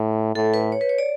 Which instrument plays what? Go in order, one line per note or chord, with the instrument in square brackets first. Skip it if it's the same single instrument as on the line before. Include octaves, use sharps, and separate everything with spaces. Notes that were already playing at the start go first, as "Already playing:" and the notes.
Already playing: [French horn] A2
[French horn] A2 [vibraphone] A4
[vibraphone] B4
C#5
B4
C#5
D5